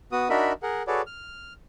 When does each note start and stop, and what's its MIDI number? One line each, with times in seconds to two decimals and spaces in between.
0.12 0.29 59
0.12 0.29 66
0.12 0.29 87
0.30 0.53 62
0.30 0.53 63
0.30 0.53 66
0.30 0.53 70
0.30 0.53 76
0.30 0.53 83
0.63 0.83 68
0.63 0.83 70
0.63 0.83 78
0.87 1.02 66
0.87 1.02 68
0.87 1.02 69
0.87 1.02 71
0.87 1.02 73
0.87 1.02 74
1.07 1.53 89